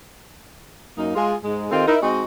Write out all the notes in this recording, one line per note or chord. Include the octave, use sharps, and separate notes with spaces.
F#2 A#3 D#4
G#3 F4 G#4
G#2 G#3
D#3 C4 D#4 F4 G4 A4
D#4 E4 A#4
G#3 C4 D#4 F#4 D#5